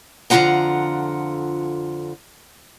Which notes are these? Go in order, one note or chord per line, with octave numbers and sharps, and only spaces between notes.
F2 D3 F3 F4 F#5 A#5